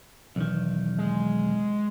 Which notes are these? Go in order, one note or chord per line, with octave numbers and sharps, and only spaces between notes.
B1 E2 D#3
G#3